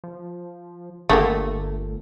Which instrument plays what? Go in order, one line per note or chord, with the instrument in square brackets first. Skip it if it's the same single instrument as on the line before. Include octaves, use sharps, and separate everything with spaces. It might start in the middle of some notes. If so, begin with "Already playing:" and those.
[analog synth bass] F3
[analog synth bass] G1 [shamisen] D3 A#3 G4 [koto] A3